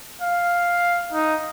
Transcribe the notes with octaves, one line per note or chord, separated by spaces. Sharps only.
F5
D#4